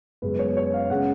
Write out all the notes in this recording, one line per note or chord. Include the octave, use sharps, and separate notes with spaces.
F#2 C#3 G#3 B3 B4
C#5
C#5
F5
C#3 G#3 C#4 F#5